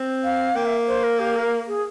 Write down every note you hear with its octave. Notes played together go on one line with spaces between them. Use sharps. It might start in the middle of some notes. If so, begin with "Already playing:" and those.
Already playing: C4
F5
A#3 G5
E5
C5
A#4
G4
A#4
G#4